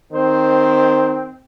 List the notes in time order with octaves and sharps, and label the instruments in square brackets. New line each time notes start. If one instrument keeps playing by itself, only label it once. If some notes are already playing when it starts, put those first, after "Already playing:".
[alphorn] D#3 [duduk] C4 [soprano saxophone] C5